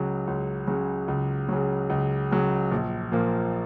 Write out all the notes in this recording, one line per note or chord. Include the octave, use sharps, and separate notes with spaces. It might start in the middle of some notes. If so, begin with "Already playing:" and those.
Already playing: C#2 C#3 F#3
C#2
C#3 F#3
C#2
C#3 F#3
C#2
C#3 F#3
A#1
A#2 F3 A#3